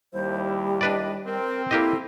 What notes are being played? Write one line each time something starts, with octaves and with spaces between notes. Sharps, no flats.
D#2 G3 E4 C5
D4 B4 D5 D#5
C4 A#4
A#3 E4 G4 A4 D#5